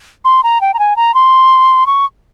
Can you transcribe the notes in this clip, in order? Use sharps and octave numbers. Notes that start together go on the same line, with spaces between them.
C6
A#5
G5
A#5
G#5
A#5
C6
C#6